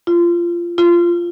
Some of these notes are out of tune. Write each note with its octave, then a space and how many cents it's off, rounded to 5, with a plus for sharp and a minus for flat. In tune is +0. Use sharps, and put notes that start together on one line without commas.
F4 -20
F4 -15